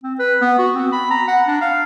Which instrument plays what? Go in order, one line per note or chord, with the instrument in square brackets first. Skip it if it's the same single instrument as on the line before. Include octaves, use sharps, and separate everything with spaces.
[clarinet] C4
B4
B3
F#4
C4
B5
A#5
F#5
D4
F5